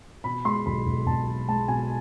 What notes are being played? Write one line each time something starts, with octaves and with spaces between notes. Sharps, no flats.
B2 B5
G#3 C6
B1 B5
B1
B1 A5
B2
G#3 A5
B2 G#5